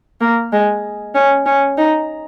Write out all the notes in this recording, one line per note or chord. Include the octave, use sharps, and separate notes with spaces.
A#3
G#3
C#4
C#4
D#4